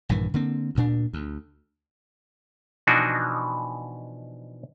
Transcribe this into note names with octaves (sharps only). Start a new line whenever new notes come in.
A#1 G2 D#3 E3
D3 A#3 C4
D2 A#2 D4
D2
B2 E3 F3 D4 D#4 F#4